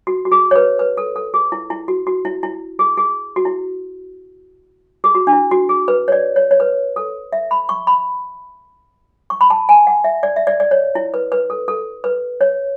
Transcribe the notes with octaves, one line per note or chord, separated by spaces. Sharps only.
F#4
F#4
G#4
C#5
B4
B4
A4
A4
G#4
E4
E4
F#4
F#4
E4
E4
G#4
G#4
F#4
E4
G#4
F#4
D4
E4
F#4
G#4
B4
C#5
D5
C#5
C#5
B4
A4
E5
B5
C#6
B5
C#6
B5
A5
G#5
F#5
E5
D5
E5
D5
D5
C#5
E4
B4
B4
A4
A4
B4
C#5